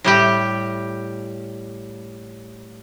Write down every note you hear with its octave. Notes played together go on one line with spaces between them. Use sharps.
A2 G3 G4